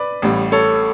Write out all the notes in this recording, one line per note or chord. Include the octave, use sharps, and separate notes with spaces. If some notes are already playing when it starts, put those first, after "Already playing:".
Already playing: B4 D5
A1 A2 G3
A4 C#5